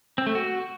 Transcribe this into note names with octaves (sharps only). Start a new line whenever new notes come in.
C4
A3
F#4